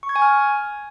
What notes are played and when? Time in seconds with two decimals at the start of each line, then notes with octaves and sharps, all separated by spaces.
0.03 C#6
0.09 G#6
0.16 G#5
0.22 F6